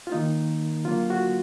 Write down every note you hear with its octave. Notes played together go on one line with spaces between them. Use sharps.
F4
D#3 A#3 D#4
D3 F#3 A#3 F4
F#4